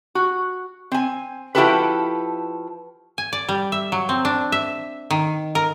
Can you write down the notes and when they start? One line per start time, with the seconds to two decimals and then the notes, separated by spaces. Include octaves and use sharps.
0.15 F#4
0.92 C4 G#5
1.55 F3 E4 F#4 G4 A4 B4
3.18 G#5
3.33 D5
3.49 G3
3.72 E5
3.92 F#3
4.09 C4
4.25 D4
4.52 E5
5.10 D#3
5.55 A#4